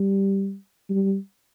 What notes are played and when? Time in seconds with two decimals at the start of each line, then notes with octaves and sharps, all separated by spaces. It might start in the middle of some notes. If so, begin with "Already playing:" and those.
Already playing: G3
0.90 G3